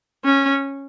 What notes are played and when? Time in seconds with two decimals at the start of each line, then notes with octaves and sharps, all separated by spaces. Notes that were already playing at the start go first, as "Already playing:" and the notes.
0.25 C#4